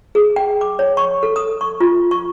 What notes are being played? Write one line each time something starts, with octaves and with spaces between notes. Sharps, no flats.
G#4
G5
D6
C#5
C#6
A4
D#6
C#6
F4
C#6